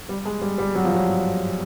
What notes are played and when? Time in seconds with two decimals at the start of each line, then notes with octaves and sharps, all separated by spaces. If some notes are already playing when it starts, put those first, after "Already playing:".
0.09 G3
0.25 G#3
0.42 G3
0.58 G3
0.75 F#3
0.84 F3
0.94 F#3